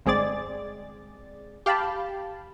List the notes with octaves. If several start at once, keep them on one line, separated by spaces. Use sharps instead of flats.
G1 G#3 C4 G#4 D5 A6
G4 F5 G5 A5 B5